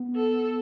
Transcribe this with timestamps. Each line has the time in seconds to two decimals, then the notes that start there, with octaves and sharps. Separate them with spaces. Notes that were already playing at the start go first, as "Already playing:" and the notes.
Already playing: B3
0.16 A4